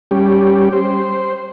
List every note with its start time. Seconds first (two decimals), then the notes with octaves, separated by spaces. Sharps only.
0.11 G3 C#4 G4
0.73 C5